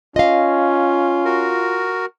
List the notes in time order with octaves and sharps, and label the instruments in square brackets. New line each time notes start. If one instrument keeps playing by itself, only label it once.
[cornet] C#4 [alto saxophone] F4 [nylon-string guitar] D#5 F5
[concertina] F#4 A#4